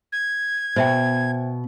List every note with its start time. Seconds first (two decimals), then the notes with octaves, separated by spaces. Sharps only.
0.12 G#6
0.76 B2 C5 E5 G5